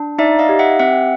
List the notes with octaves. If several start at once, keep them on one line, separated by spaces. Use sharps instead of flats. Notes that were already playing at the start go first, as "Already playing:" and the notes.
Already playing: D4
D#4 D5 E5
D#5 F5
G4
E5 F#5
C4 E5 F#5